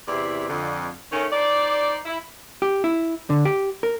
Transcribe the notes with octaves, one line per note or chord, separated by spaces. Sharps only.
E2 C3 E4 G4 D5
F2 D3
D#3 A3 C#4
D#4 C5 D5
E4
G4
E4
D3
G4
A#4